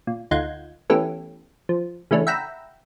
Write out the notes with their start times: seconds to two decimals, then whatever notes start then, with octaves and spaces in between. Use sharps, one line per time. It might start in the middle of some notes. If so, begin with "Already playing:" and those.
0.07 A#2
0.31 D2 D#4 F4 F#5 G6 G#6
0.90 E3 A3 B3 C#4 G4 A4
1.69 F3
2.11 C#3 E3 A3 C#4 D4
2.27 E5 F#5 G5 A#5 B5 E6